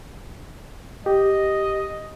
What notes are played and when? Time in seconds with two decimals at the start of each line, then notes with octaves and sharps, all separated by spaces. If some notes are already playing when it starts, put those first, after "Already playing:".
1.06 G4 D#5